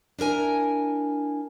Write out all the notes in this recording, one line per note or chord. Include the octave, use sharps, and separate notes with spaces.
D4 E4 A#4 G#5